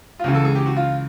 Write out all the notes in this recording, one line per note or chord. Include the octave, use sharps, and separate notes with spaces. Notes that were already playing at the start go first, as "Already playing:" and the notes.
F4
C#2 C#3 E3 F#4
A4
G#4
G4
F#4
F4